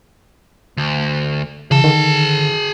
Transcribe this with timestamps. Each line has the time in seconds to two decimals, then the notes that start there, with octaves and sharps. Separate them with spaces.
0.77 D2
1.71 C#3 E3 G#4 A5
1.84 D3 D#3